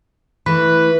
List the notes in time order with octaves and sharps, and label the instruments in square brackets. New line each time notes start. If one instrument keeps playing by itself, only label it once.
[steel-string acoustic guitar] E3 A3 [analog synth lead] B4